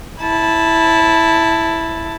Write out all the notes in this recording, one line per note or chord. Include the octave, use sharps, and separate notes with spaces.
E4 A5